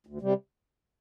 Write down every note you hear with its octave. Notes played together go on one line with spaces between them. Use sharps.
D2
C3 G3